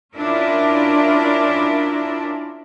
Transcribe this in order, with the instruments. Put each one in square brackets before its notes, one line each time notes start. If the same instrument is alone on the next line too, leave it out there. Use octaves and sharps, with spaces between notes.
[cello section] C#4 D4 E4 F4 A#4 D5